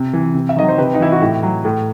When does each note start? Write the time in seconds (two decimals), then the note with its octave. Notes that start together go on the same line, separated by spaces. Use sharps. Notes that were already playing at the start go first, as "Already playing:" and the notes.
Already playing: C3
0.13 E3
0.34 C3
0.49 E5
0.56 D#3 F#3 D#5
0.68 C5
0.78 C3 G4 B4
0.94 D#4
1.00 E3 E4
1.12 F#4
1.21 A2 E4 G4
1.43 F#3
1.65 A2